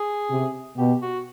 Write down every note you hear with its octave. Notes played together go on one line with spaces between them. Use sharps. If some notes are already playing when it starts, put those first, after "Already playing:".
Already playing: G#4
C3
B2 G4
F#4